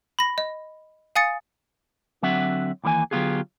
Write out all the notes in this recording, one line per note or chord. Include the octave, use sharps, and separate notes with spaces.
B5 A#6
D#5
F5 G#5 D#6 A6 C#7
D3 F#3 C4 F#4 E5 F#5
D#2 E3 A#3 C5 G#5
D3 F#3 B3 F4 G4 G#4